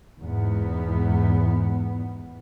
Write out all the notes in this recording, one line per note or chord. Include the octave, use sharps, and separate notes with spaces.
E2 G#2 B3